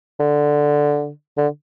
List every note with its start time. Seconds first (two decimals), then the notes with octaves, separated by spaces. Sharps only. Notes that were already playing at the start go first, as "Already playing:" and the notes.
0.20 D3
1.38 D3